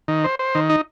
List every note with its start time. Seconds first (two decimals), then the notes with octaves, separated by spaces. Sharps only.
0.08 D#3
0.24 C5
0.39 C5
0.55 D#3
0.70 D#4